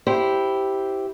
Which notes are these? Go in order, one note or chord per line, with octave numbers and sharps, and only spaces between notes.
E4 G4 C5